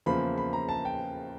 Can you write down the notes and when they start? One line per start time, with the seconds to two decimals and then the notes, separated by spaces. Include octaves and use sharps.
0.06 E2 C#3 F3 A#3 B5
0.38 B5
0.53 A#5
0.69 A5
0.85 G5